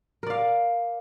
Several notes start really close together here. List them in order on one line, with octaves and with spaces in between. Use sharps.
A#4 D5 F5